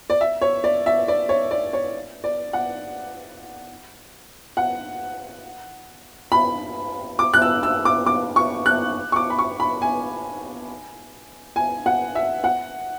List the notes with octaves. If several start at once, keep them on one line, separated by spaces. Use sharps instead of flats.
D5
E5
C#5
D5
E5
D5
C#5
D5
C#5
D5
F#5
F#5
B5
D6
F#6
E6
E6
D6
D6
C#6
F#6
C#6
D6
B5
C#6
B5
G#5
G#5
F#5
E5
F#5